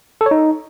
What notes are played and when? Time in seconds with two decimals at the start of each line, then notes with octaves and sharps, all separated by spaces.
0.21 A4
0.26 C#5
0.31 D#4